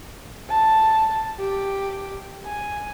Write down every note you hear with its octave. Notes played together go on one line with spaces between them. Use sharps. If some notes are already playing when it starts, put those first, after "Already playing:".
A5
G4
G#5